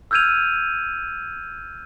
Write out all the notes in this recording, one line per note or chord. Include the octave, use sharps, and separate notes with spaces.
E6 F6 G6 G#6 D#7 F7